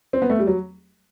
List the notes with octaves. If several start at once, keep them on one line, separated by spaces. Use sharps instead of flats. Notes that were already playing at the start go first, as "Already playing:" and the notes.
C4
B3
A3
G3
F#3